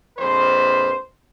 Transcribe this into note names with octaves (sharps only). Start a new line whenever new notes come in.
A#1 F2 B4 C5